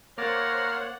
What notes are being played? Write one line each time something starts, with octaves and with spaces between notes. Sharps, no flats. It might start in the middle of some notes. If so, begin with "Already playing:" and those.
A#3 C5 C#5 F#5 A#5 D6 F6 A6